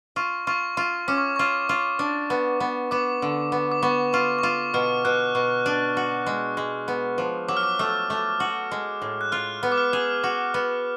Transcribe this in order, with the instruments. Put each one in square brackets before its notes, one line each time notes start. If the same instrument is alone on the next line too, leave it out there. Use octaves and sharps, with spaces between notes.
[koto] F4 [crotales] C#6
[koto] F4 [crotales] C#6
[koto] F4 [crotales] C#6
[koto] C#4 [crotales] D6
[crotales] C#6
[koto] F4 [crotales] C#6
[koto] F4
D4
B3
B3
[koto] B3 [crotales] D6
[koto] D3
B3
[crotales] D6
[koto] B3 [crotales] C#6
[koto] F4 [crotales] C#6
[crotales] C#6
[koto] F4 [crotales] D6
[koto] B2 [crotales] F6
[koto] B2 [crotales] F#6
[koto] B2 [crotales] C#6
[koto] D4
F#4
G#3
G#3
B3
F3
[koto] F#3 [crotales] D6
[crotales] F6
D6
[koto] A3
A3
F#4
G#3
A2
[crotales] F#6
[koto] F4 [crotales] F6
[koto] B3
[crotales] D6
F6
[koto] G#4
F#4
B3